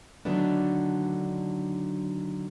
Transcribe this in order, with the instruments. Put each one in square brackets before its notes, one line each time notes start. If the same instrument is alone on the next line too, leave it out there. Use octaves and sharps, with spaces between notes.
[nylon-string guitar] D3 D#3 F#3 A3 B3 D4